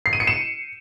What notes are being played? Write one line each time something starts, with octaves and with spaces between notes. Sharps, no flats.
C7
D#7
C#7
E7